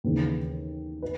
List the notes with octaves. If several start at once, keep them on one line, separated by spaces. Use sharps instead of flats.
D#2 C#3 E3 B3
B4